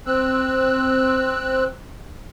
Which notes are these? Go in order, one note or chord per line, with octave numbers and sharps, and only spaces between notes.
C4 E6 F#6